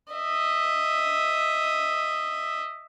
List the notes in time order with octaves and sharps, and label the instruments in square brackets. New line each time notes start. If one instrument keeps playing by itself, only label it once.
[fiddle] D#5 E5